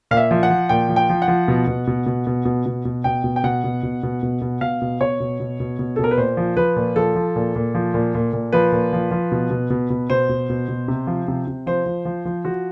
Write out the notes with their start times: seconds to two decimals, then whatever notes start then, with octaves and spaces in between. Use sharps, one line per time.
0.11 A#2 F5
0.17 E5
0.31 F3
0.43 F#5
0.50 F3
0.69 A#2 G5
0.89 F3
0.96 G5
1.09 F3
1.22 F#5
1.28 F3
1.48 B2
1.67 B2
1.87 B2
2.06 B2
2.27 B2
2.45 B2
2.66 B2
2.85 B2
3.04 B2 G5
3.24 B2
3.36 G5
3.44 B2 F#5
3.64 B2
3.83 B2
4.03 B2
4.23 B2
4.41 B2
4.61 B2 F5
4.82 B2
5.01 B2 C#5
5.20 B2
5.40 B2
5.60 B2
5.79 B2
5.96 A4
5.99 B2 A#4
6.11 B4
6.17 A#2 C5
6.37 F3
6.57 F3 B4
6.76 A#2
6.96 F3 A4
7.15 F3
7.36 A#2
7.55 A#2
7.75 F3
7.94 A#2
8.15 A#2
8.33 A#2
8.53 F3 B4
8.72 A#2
8.93 F3
9.11 F3
9.32 B2
9.50 B2
9.70 B2
9.90 B2
10.10 B2 C5
10.29 B2
10.50 B2
10.68 B2
10.88 C3
11.07 F3
11.28 C3
11.48 C3
11.67 F3 C5
11.86 F3
12.05 F3
12.25 F3
12.45 F3 F#4